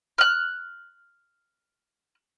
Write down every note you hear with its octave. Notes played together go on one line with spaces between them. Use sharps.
F6 F#6